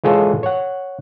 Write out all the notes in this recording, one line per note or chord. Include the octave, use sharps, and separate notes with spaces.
E3 G#3 F4 G#4 A4 C#5
C#5 F#5